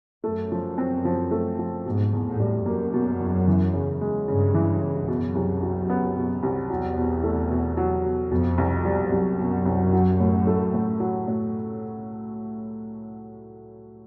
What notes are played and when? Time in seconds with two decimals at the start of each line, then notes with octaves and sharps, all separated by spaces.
0.24 F#2 A3
0.52 F3
0.78 C4
1.05 F3
1.31 A3
1.59 F3
1.85 G#2 B2
2.13 E2
2.26 A2
2.40 G3
2.66 F#2 A#3
2.94 B2
3.20 E2
3.48 E3
3.73 C#3
4.01 G#3
4.28 G2 C#3
4.54 E3
4.82 C#3
5.08 F#2 B2
5.35 C2
5.62 F#3
5.90 B3
6.17 B2
6.43 C2
6.70 E2 F#3
6.97 B2
7.24 A3
7.51 B2
7.77 F#3
8.05 B2
8.31 F2 B2
8.58 C2
8.85 G3
9.12 C2 F#2
9.39 B2
9.65 C2
9.93 F#3
10.20 A2
10.47 A3
10.74 A2
11.00 F#3
11.28 A2